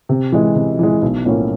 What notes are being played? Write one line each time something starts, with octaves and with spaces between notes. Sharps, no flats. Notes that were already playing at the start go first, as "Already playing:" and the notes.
C3
E3 G#3
C3
E3 G#3
B1
A2 F3 A#3 C#4